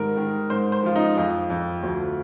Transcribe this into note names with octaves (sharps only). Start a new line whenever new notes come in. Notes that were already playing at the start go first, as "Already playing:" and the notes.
Already playing: G#2 D#3 G3 A#4
D#3
G#2 C5
C5
F3 F4
D#4
F2 F4
F2
D2